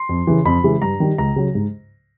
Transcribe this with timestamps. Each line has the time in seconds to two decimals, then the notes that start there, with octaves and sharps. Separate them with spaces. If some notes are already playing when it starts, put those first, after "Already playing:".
Already playing: C6
0.09 F2
0.27 C#3 E3
0.45 F2 B5
0.64 C#3 E3 G#3
0.82 G2 A#5
1.00 D#3 G3
1.18 C#2 A#5
1.36 C#3 F#3
1.55 G#2